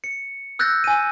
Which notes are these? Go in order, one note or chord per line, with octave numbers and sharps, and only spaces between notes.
C#7
E6 F#6 G6 A6 A#6
G#5 D#7